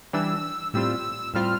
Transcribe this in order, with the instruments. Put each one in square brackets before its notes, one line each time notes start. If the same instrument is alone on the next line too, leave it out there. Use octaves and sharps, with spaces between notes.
[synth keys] E3 G3 D4 [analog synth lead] E6
[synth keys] A2 G3 C4 F4 [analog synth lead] E6
[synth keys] A2 G3 C4 F4 [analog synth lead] F6